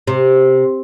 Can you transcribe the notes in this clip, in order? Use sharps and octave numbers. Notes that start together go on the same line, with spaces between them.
C3